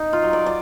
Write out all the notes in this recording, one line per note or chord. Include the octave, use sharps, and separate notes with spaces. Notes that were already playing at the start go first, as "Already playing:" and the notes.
Already playing: D#4
F4
F#3
D5
D5